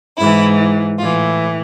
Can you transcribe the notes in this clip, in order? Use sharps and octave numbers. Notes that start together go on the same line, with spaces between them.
G#2 E3 E4
A2 E3 F4